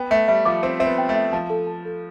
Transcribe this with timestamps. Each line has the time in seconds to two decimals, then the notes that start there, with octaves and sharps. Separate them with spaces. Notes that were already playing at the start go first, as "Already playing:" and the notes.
Already playing: B3 G5
0.11 A3 E5
0.28 G3 E5
0.45 F3 D6
0.63 C4 C5
0.80 C4 E5
0.86 B3
0.98 G5
1.09 A3
1.15 E5
1.32 F3 A5
1.50 A4
1.67 A5
1.85 A4